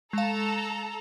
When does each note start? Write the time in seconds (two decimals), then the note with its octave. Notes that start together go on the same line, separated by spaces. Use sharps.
0.13 G#3 A4 F5 A5 A#5